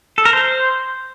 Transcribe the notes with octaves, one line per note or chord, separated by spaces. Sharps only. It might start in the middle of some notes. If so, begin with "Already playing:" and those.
A4
A#4
C5